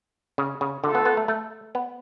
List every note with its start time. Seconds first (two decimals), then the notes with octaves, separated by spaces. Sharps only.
0.38 C#3
0.61 C#3
0.83 D3 A3 F4 A4
0.95 B3
1.05 B3
1.17 A3
1.28 A3
1.75 B3